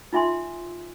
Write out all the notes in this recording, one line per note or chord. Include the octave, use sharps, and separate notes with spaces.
D#4 F4 E5 G#5 C6